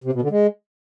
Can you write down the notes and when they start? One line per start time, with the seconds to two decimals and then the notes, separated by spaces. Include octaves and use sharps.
0.04 C3
0.13 B2
0.22 D3
0.31 G#3